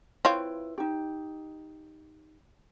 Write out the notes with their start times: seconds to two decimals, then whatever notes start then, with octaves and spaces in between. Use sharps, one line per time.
0.25 C4 E4 F4 B4 C#5 F5
0.78 D#4 G4